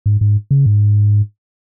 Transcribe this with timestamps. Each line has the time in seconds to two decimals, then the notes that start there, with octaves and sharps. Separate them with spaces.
0.06 G#2
0.21 G#2
0.51 C#3
0.66 G#2